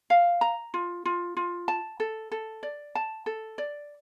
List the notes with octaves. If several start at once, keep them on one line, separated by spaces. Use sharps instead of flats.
F5
A#5
F4
F4
F4
A5
A4
A4
D5
A5
A4
D5